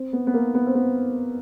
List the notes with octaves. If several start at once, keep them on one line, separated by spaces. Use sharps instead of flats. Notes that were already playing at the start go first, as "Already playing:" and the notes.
Already playing: C4
B3
B3
A#3
B3
C4
B3